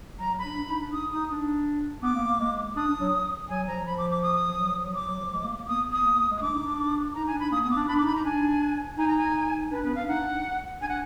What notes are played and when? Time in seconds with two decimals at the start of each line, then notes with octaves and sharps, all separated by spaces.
0.20 F#3 A#5
0.31 F#3
0.38 B5
0.45 D4
0.57 D4
0.69 D#4
0.81 D4
0.93 D#4 D#6
1.11 D#4 D#6
1.30 D4
2.02 B3 D6
2.15 A#3
2.27 A#3
2.40 G#3
2.76 D4 D#6
2.88 D4
3.00 F#3
3.49 F#3 G#5
3.67 F3 A#5
3.84 F3 B5
3.98 D6
4.10 D6
4.23 D#6
4.47 F3
4.59 F#3
4.71 F3
4.83 F#3
4.95 D6
5.07 F#3
5.20 F3
5.32 G#3
5.44 A#3
5.56 A#3
5.68 B3 D#6
5.92 D#6
6.05 A#3
6.30 G#3
6.38 D#6
6.41 D4 D6
6.54 D#4
6.66 D4
7.14 D#4 A#5
7.27 G#5
7.33 D4
7.40 B5
7.52 A#3 D#6
7.63 B3 D#6
7.71 D6
7.76 D4
7.88 D4 B5
7.98 D6
8.01 D#4
8.06 B5
8.13 D#4 A#5
8.25 D4 G#5
8.98 D#4 G#5
9.08 A#5
9.18 G#5
9.71 D4 B4
9.84 B3 B4
9.95 D4 F5
10.08 D#4 F#5
10.20 D4
10.81 D4 G#5
10.89 F#5